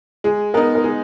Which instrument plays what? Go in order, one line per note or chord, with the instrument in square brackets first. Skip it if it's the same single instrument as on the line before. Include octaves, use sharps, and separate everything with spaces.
[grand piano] G#3 [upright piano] G#4
[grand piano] B3 D#4 [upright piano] A#4
[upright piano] A#4
[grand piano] G#3 [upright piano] G#4